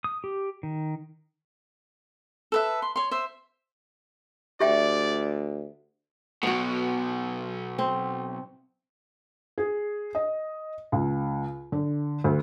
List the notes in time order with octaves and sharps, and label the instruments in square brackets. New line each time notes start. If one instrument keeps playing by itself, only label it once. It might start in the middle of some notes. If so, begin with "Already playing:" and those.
[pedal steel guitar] D#6
G4
D#3
[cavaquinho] A4 B4 E5
C6
C#5 C6
C5 E5
[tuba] D2 [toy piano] G4 E5 G5 [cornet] D5
[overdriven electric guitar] B1 B2 [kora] B3 F#4
[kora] C4
[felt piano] G#4
D#5
C#2
D3
D2